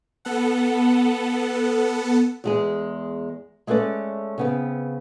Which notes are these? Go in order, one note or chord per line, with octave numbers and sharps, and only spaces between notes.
B3 A4 F#5
E2 G#3 G#4
G#3 A3 C#4 B4 D5
C#3 B3 C4